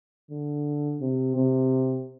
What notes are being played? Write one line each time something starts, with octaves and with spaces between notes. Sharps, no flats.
D3
C3
C3